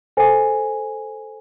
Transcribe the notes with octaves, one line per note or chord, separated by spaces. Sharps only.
A4 C5 G#5